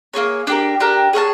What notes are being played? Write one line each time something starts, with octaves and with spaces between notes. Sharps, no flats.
A#3 D#4 G#4 C#5
D4 G4 A#4
D4 G4 A#4
G#4 C#5 F5 A5